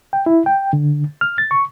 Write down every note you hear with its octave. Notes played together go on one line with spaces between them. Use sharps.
G5
E4
G5
D3
F6
A6
C#6